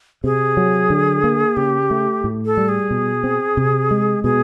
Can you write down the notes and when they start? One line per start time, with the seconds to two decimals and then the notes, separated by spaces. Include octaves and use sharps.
0.24 C3 G#4
0.57 F#3
0.90 D3
1.24 A#3
1.57 C#3 G4
1.90 A3
2.24 A2
2.46 A4
2.57 G3
2.69 G#4
2.91 B2
3.24 C4
3.57 C3
3.91 G#3
4.24 B2 G#4